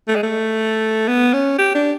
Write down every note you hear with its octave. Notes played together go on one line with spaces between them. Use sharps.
A3
G#3
A3
B3
C#4
G4
D4